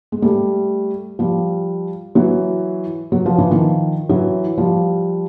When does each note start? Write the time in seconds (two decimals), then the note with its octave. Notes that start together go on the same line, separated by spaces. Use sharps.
0.12 G#3
0.22 G3 A3
1.19 F3 G3
2.15 E3 F#3
3.12 F#3
3.26 F3
3.38 E3
3.51 D#3 F3
4.09 E3 F#3
4.57 F3 G3